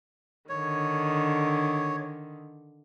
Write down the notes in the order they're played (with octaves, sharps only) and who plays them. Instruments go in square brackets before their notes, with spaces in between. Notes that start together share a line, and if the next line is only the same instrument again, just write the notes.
[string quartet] D3 D#3 [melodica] C#5